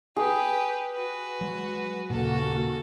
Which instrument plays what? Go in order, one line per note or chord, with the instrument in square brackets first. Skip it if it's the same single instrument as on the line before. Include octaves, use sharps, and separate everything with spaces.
[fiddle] G4 B4 [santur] G#4
[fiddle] F#4 B4
[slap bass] F#3 G#3
[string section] D#2 A#3 F#4 [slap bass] A#2 C#3 [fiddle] A4